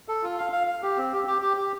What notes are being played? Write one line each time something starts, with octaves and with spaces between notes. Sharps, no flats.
A4
F4
F5
F5
F5
G4
C4
G4
G4
G4
G4